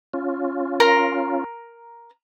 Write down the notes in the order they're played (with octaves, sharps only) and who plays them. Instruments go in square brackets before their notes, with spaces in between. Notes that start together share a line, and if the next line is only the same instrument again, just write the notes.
[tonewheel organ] C#4 F4
[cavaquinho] A#4 A#5 C6